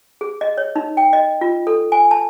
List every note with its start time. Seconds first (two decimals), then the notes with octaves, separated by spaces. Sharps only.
0.21 G#4
0.41 D#5
0.57 C#5
0.76 D#4
0.97 G5
1.13 D#5
1.41 F4
1.67 A4
1.92 G#5
2.11 A5